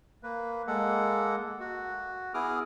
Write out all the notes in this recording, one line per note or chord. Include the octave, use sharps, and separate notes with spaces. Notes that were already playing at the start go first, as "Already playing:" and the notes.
A#3 B4
G#3 A#3 A4 F#5
F#4
B3 E4 G#4 D6 D#6 F6